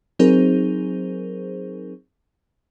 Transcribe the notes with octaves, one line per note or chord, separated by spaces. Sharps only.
F#3 C4 D#4 G#4 A#4 C5